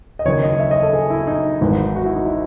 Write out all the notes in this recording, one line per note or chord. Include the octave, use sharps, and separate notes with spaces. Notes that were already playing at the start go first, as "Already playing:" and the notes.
D#5
F#1 F#2 D#3 C#5
D#5
E5
D#5
A4
G#4
E4
D#4
G#1 G#2 E3
F#4
E4
D#4
E4